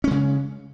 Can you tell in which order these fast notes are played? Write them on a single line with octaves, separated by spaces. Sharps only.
C#4 G#3 C#3